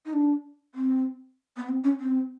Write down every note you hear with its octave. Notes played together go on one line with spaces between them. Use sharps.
D#4
D4
C4
B3
C4
C#4
C4